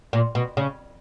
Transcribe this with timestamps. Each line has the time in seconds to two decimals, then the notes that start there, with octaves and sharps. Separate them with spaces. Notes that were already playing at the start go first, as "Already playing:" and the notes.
0.13 A#2
0.35 B2
0.57 C#3